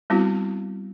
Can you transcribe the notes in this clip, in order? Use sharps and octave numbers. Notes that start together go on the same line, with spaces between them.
G3 B3 C4 E4 F#4